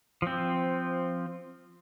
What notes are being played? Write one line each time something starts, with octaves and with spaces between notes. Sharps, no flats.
F3 C4